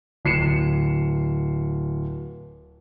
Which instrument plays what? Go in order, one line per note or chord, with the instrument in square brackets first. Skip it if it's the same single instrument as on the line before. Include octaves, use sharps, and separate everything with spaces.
[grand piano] D1 C7 C#7 E7